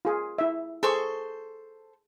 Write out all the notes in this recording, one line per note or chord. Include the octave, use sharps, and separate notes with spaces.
F4 G#4
E4 E5
G#4 A4 C5 C#6